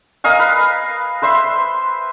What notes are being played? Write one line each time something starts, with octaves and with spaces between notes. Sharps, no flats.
A#4 D#5 F5 G#5
B4
B4 C5 E5 C6